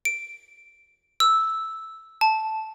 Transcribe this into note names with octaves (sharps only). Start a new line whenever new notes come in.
D7
E6
A5